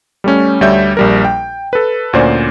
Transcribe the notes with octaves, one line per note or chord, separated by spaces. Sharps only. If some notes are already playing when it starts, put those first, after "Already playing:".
G3 A3 C#4
D2 G3 C#5 E5 G6
A#1 G3 A#4
G5
A4 B4
D2 A#2 C#4 C5 D5